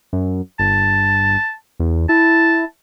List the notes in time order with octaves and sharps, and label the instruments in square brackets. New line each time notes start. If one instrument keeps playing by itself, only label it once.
[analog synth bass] F#2
[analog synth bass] G1 [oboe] A5
[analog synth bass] E2
[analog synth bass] E4 [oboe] A5